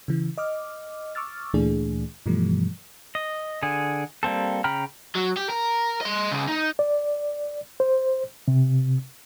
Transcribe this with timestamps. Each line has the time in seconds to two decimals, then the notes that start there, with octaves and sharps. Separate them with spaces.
0.08 C#3 E3
0.38 D#5 D6 F6
1.15 C#6 D6 E6 F6 A6
1.54 D2 A#2 E3 A3 D4 G#4
2.26 G2 B2 E3 F3 G3 A3
3.15 D#5
3.63 D3 G#4
4.23 G3 A#3 C4 A4
4.64 C#3 G5 A#5 B5 F6
5.16 F#3
5.37 G4
5.49 A#4
6.01 D#5 C6
6.32 C#3 G#3
6.48 D#4
6.79 D5
7.80 C5
8.48 C3